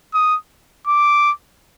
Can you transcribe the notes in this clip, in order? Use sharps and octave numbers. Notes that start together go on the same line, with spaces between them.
D#6
D6